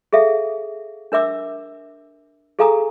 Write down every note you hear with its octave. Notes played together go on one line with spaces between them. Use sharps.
G#4 A4 E5 F5
D4 A#4 E5 D6 E6
G#4 A4 F5 G#5 A#5 D#6